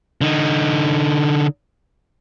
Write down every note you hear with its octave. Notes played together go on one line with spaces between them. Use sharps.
D3 D#4